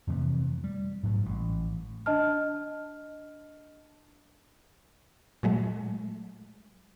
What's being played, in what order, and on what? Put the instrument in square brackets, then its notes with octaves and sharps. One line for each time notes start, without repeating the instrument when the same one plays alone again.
[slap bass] F2 C3 E3 A3
G3
G#2 F#3 A3
A1
[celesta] D4 D#5 A5 F6
[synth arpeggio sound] A#2 F#3 G#3 A3